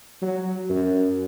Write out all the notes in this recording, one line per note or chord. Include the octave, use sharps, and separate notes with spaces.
F#3
F#2